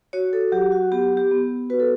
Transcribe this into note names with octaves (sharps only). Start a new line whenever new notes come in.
F#4 C#5
A4
F#3 G4
F#4
B3 G4
G4
B3
F#4 B4
A4